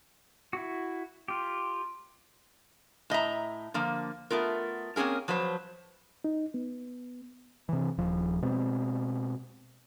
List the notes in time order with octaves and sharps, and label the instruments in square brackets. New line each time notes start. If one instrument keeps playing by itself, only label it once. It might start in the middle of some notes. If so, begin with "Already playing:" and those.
[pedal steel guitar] E4 F#4
F4 G4
[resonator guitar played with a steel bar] A2 D#5 E5 A#5
D3 F3 A#3
A3 B3 F4 A#4
A#3 C4 C#4 G#4 A#4
F3 F#3 B4 C5
[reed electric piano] D#4
B3
[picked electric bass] C3 E3
D#1 F3
B2 G#3 C4